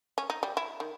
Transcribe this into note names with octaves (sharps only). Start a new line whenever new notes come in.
C#4
D#4
G3
E4
D#3